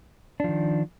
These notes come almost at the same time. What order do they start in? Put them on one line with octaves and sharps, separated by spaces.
D4 F3 D#3